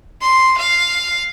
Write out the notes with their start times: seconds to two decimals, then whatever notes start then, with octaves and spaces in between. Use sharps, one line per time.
0.21 C6
0.58 F5